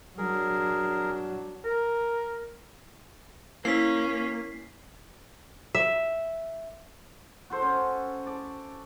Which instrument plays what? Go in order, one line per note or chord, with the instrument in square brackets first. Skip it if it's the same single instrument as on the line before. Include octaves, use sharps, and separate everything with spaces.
[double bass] F#3 D4 [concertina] G#4 A#4
[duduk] A#4
[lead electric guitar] A#3 [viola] C#4 [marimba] E4 [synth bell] B6 C7
[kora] E5
[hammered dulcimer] F#4 A4 C5
C#4
D5 A5